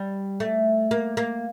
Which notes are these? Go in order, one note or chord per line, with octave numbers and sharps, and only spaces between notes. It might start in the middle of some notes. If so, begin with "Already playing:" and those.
Already playing: G3
A3
A#3
A#3